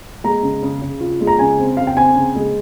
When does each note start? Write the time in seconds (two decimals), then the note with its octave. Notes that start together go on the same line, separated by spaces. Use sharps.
0.24 G#3 A#5
0.43 C#3
0.62 C#3
0.82 C#3
1.01 F4
1.20 G#3
1.27 A#5
1.39 C#3 G#5
1.58 C4
1.77 C#3 F5
1.87 G5
1.96 C4 G#5
2.15 C#3
2.36 G#3